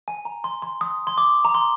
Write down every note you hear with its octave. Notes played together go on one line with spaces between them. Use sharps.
G#5
A#5
C6
C6
D#6
C6
D6
A#5
C6